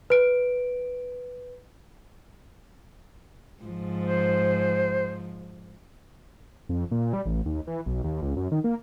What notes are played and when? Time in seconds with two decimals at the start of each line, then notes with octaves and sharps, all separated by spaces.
0.10 B4 D7
3.64 G#2 F3
4.03 C5
6.69 F2
6.91 A#2
7.13 G3
7.26 A1
7.46 D#2
7.67 E3
7.86 B1
8.04 D#2
8.22 C#2
8.36 F#2
8.52 D#3
8.64 A#3